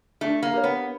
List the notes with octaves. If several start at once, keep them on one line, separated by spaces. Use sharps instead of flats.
A3 D4
A#3
G4 A#4 C#5
B3